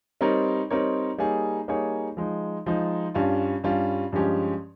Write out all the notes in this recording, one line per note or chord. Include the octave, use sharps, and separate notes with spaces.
G3 C4 D#4 A#4 C#5
G3 C4 D#4 A#4 C#5
G3 A#3 D#4 G#4 C#5
G3 A#3 D#4 G#4 C#5
F3 G#3 D#4
F3 G#3 D#4
G2 G3 C#4 F4
G2 G3 C#4 F4
G2 F3 G#3 C#4 G4